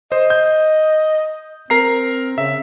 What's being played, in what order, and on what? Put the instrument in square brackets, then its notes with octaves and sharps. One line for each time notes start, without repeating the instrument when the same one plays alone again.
[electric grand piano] C5 [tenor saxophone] D#5
[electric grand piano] G6
[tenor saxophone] C4 [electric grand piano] A#4 A#5 C7
[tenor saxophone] C#3 [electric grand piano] E5